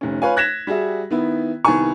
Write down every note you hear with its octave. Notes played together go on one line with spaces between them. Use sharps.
F1 D#3 C#4
F4 B4 C#5 F5 G#5
F#6 G#6 A#6 B6 E7
G3 F#4 G#4 E5
D#3 B3 E4
C2 D#3 B3 G#5 C#6